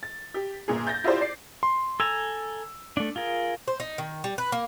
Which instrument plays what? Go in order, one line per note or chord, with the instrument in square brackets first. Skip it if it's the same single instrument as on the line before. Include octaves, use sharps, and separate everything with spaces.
[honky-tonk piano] A6
G4
G1 A#2 G#4
G6 A6 A#6
E4 F4 G4 G#4 C5 D5
D5 C7
[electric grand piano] C6
[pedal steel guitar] A4 G#5 A#5 [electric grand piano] E6
[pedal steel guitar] A3 D4
F4 G#4 A#4
[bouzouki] C5
D#4
D#3
G3
B4
A#3